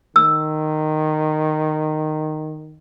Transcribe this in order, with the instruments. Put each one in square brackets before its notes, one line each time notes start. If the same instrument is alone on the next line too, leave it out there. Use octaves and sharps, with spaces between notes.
[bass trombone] D#3 [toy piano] E6